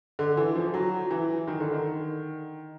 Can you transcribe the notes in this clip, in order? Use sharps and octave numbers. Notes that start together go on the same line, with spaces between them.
D3
E3
F3
F#3
E3
D#3
D3
D#3